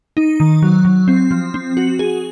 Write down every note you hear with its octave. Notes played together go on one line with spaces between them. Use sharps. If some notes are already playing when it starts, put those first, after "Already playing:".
D#4
D#3
F#3
F#3
C4
F3
C4
F#4
G#4